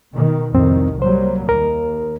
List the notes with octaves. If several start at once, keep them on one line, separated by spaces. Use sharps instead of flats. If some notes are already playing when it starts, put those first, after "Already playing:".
B2 D#3
C2 F2 A2 D#3 C4
F#3 G3 A#3 C5
D#2 A#4